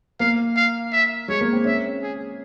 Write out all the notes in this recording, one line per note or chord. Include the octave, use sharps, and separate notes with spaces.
A#3 F5
F5
E5
G#3 C#5
A#3
C4
C#4 E5
G#4